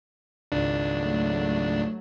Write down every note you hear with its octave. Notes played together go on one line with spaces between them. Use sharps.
G#1 C#2 D4
F#3 A3